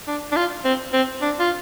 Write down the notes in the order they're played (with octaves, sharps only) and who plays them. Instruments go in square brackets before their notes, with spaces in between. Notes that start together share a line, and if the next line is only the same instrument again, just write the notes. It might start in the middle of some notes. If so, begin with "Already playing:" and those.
[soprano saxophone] D4
D4
F4
C4
C4
D4
F4